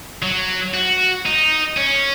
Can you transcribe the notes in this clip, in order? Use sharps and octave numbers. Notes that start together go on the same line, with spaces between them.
F#3
F#4
D#4
C#4